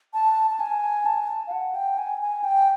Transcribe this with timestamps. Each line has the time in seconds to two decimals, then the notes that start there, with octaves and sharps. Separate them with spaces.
0.14 A5
0.51 A5
0.60 G#5
1.05 A5
1.47 F5
1.52 F#5
1.75 G5
1.98 G#5
2.22 G#5
2.44 G5